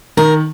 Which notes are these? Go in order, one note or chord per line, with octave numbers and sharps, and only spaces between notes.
D#3 A#4